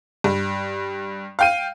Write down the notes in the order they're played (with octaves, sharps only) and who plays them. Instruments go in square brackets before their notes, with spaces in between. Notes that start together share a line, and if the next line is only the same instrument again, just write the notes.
[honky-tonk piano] G2
F5 G5 D#7